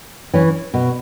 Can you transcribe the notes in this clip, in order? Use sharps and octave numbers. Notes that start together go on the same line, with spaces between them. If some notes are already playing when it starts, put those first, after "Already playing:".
E3 C#4
B2